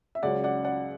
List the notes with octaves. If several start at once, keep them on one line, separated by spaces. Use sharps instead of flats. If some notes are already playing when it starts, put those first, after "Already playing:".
E5
C#2 C#3 F#3 C#4 D5 F#5
D5 F#5
D5 F#5